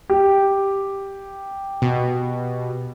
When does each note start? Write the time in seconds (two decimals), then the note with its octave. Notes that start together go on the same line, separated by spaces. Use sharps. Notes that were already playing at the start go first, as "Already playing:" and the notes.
0.10 G4
1.82 B2